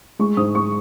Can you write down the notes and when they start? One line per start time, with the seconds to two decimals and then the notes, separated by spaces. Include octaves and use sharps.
0.19 G#3 C#6
0.37 G#2 D#6
0.55 G#3 C#6